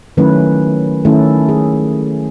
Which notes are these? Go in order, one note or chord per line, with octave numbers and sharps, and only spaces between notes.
D#3 F#3 A3 C#4 E4 B4
D#3 A3 C#4 E4 A4
G#4